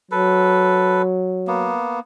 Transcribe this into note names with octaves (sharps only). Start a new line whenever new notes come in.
F#3 A4 B4
A#3 B3